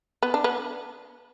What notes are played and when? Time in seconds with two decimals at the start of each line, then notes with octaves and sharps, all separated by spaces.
0.23 B3
0.34 D4
0.44 B3